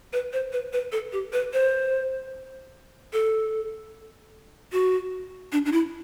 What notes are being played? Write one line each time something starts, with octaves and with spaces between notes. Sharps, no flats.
B4
C5
B4
B4
A4
G4
B4
C5
A4
F#4
D4
D4
E4